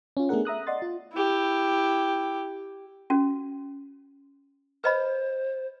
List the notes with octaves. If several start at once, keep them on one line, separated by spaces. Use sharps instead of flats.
C#4 F4
A3 B3 D4 G#4 A#4 F#5
E5 A#5 D#6 F#6
D5 D#5 F#5 C6 A6
F4
E4 G4
C#4 F#4
B4 C5 D#5 B5